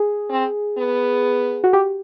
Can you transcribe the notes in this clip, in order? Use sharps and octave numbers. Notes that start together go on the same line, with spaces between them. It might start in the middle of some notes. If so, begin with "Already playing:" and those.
Already playing: G#4
C4
B3
F#4
G4